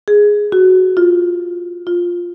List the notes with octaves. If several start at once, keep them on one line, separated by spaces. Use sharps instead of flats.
G#4
F#4
F4
F4